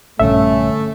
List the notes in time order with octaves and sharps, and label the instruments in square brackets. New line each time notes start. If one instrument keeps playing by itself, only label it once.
[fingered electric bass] A#1 G2 D3 [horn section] A3 [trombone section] C#4 [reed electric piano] E5